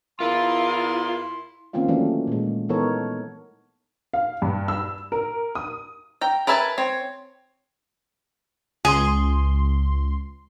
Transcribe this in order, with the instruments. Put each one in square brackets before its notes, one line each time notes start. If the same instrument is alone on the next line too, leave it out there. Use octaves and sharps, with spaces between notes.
[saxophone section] E2 A#4 [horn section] E4 C6 [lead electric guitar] F4
[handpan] D#3 A#3 C4 C#4 F4 F5
E3 F#3 A3 A#3 C#4 D4
A#2 G#3
E3 B3 D#4 A4 A#4 C#5
[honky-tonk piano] F5
G2
E6
A#4
D#6
[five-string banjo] G5 A#5
A#4 B4 E5 G#5 A5
C4 C#5
[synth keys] C#2 C6 [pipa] G#4